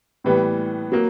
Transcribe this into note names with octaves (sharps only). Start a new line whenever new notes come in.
A2 E3 G3 B3
F#3 A#3